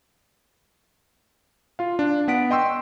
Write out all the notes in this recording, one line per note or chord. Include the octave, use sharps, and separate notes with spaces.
F4 F5
D4
B3 F#5 B6 D7
D#5 G5 C6 C#6 E6